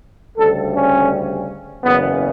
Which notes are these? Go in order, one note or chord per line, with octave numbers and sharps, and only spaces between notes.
D2 C#3 G3 A4
C#4
F#1 E2 C#3 F#3 B3